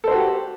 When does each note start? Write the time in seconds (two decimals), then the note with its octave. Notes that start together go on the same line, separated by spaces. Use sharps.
0.04 A4
0.08 C5
0.11 F#4
0.15 G4